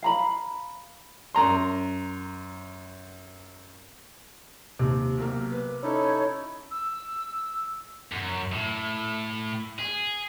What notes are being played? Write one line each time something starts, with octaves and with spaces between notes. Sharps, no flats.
F5 A#5 B5
F#2 A#5 C6
D#2 C3
B1 A#3 F6
B4
C#4 D#4 E4 A4 C#5
E6
F#2
A2
G#4